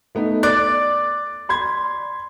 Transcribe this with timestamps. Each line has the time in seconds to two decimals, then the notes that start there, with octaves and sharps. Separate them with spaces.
0.15 A3 B3 D#4
0.43 D5 F#6 A6
1.49 B5 C6 G#6